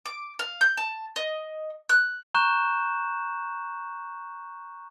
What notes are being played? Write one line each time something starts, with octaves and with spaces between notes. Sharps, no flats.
D6
F5
G6
A5
D#5
F#6
A#5 C#6 F#6 G6 E7